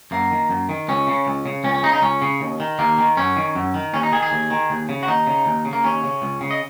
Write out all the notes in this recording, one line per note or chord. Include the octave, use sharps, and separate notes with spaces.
F#2 A#3
D#3
F#2
D#3
C#2 C#4
C#3
C#2
C#3
C#2 C#4
C#4
C#3 D#4
D#4
C#2 C#4
C#3
D#2
D#3
D#2 A#3
D#3
F#2 C#4
D#3
F#2
D#3
D#2 C#4
D#4
D#3 G#4
G#4
D#2
D#3
D#2
C#3
F#4
D#2 D#4
C#3
D#2
C#3
A#3
D#2 C#4
C#3
C#2
C#3
D#5